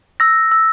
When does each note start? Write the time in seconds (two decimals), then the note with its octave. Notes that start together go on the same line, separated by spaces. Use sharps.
0.20 E6 A#6
0.52 E6